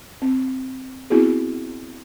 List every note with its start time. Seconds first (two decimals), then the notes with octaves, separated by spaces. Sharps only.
0.22 C4
1.10 B3 C4 E4 F#4 G#4